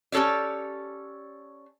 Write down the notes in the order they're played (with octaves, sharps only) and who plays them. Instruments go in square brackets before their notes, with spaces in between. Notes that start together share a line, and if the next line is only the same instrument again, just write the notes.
[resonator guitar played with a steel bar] C#4 G4 A4 C#5 D5